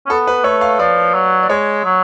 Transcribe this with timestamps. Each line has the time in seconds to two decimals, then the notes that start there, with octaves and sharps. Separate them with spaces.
0.06 C#4
0.09 B3 A4
0.27 B4
0.44 A3 C#5
0.61 F5
0.79 F3 D5
1.14 F#3
1.43 D5
1.49 G#3 C#5
1.84 F#3